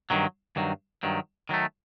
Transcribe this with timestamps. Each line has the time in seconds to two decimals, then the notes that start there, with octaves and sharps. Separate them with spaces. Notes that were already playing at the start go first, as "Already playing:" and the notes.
0.10 G2 D#3 F#3
0.56 G2 D#3 F#3
1.03 G2 D#3 F#3
1.49 D#3 F#3 A3